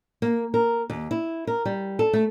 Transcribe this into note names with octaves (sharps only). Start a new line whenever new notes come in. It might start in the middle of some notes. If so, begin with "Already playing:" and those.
A#3
A#4
D#2
E4
A#4
G3
A4
A3